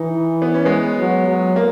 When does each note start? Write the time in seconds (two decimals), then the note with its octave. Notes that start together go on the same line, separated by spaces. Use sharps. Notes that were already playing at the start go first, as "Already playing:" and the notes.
Already playing: E3 D#4
0.42 B3
0.54 C#4
0.65 G#3 B3
0.99 F#3
1.28 F#3
1.56 A#3